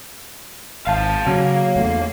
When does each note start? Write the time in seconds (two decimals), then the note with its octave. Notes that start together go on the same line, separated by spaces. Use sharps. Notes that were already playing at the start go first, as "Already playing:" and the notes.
0.87 G#1 F5 A5
1.27 C#3 F#3 A#3 C#4
1.76 E2 A3